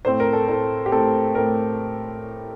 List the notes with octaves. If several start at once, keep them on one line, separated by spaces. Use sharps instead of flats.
A2 A3 C4 C5
A#4
A4
A2 A3 C4 A4
G4
A2 A3 C4 A4
A2 A3 C4 A#4